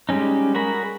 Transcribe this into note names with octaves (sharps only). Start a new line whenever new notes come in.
G3 G#3 C#4 D#4
F#4 G#4 A#4 B5